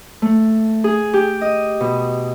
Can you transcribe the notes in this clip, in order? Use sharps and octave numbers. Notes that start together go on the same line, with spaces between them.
A3
G#4
G4
D#5
B2